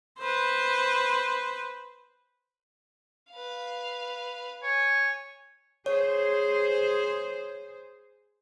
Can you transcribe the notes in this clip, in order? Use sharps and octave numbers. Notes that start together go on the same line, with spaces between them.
B4 C5
B4 F5
C#5 G#5
G#4 C5 C#5